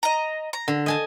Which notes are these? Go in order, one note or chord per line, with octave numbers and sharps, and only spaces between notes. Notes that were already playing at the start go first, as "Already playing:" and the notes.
D#5 A#5
A#5
D3
D#5 G#5 A5